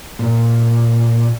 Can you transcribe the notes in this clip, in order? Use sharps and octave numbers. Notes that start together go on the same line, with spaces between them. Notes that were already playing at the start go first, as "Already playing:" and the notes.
A#2